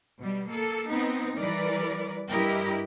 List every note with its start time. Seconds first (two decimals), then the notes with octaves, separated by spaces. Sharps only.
0.20 B2 G3
0.50 A#3 A4
0.90 B3 C4 D#4
1.39 E3 G3 A#4 B4 D5
2.30 G2 E4 G4 A#4 D#5